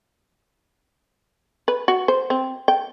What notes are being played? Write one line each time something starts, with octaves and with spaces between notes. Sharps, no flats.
B4
F#4
C5
C4
G5